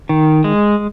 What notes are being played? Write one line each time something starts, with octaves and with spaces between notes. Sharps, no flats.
D#3
G#3